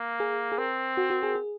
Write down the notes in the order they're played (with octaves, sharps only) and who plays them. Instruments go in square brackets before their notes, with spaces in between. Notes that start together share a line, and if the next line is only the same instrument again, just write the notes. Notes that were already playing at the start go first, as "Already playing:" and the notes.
Already playing: [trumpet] A#3
[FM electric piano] G#4
G#4
[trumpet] C4 [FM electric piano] A#4
[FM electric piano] F#4
F#4
G#4
G#4